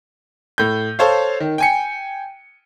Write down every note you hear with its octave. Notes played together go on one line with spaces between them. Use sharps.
A2 G6
A4 C5 C#5 F5
D#3
G5 G#5 C#7